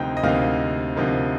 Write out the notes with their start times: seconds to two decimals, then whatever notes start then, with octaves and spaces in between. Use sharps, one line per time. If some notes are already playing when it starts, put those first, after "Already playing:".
Already playing: D2 C3 F3 A#3 D#4 D#5 G5
0.17 D#5
0.23 D2 C3 F3 A#3 D#4 F5
0.95 D2 C3 F3 A#3 D#4